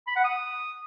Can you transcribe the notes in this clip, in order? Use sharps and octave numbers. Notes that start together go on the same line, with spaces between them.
B5
F#5
D#6